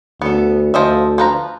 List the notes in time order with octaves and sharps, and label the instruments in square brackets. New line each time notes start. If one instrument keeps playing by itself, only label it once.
[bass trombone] D2 [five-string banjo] B3 A4
[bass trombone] D2 [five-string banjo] F3 D#5 E5
[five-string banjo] F3 B4 A#5